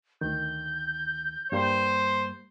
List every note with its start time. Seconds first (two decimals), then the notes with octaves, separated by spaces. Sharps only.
0.21 D2 D#3 G6
1.52 G2 G3 A#3 C5